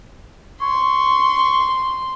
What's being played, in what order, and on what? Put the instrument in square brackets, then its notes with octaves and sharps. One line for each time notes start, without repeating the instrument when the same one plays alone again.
[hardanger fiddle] C6 [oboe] C#6